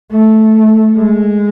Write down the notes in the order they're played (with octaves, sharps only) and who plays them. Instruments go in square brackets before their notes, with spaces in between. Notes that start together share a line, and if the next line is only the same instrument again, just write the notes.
[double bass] A3
G#3